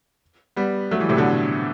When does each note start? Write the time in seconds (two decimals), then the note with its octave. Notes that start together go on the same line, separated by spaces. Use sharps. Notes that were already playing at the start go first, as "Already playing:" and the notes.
0.56 G3 B3
0.91 F#3 A3
1.00 E3 G3
1.09 A2 C3
1.17 B2 D3